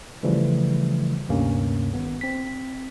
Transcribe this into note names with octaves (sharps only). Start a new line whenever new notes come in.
C#3 E3 F3 G3 A3
D2 G2 C3 A#3 C#4
G#1 B3
C4 B6